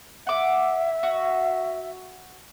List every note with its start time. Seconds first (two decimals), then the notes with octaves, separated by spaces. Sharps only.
0.27 E5 F#5 D6
1.03 F#4